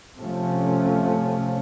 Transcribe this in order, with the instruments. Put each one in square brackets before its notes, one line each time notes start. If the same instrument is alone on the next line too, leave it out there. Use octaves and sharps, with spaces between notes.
[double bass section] C3 F3 A3 C#4